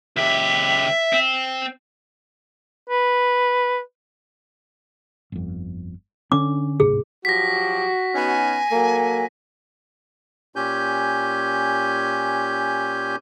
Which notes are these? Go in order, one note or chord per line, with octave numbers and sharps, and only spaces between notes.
C#2 G4 E5
C4
B4
G1 F2
D3 C#4 D4 D6
D1 G#2 C3 G#4
F3 F#3 F#4 G4 A#6 B6
B3 C#4 D#4 G#5
F#3 A#3 A4
A#2 C#4 G4 G#5 G6